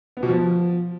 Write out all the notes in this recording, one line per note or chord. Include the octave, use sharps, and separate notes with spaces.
B3
B2
F3